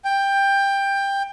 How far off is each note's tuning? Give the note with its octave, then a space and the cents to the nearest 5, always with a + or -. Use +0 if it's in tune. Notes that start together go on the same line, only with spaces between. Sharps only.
G5 +15